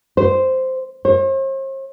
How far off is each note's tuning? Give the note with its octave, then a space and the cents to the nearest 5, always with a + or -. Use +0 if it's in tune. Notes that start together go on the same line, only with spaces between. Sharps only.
C5 -5
C5 +45